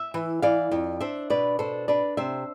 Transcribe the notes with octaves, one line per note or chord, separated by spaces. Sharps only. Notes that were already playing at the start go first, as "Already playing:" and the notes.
Already playing: E5
E3
E3 D5 F5
F2
D4 C5 E5
B2 B4 D5
D4 A4 C5
D4 B4 D5
C3 C5 E5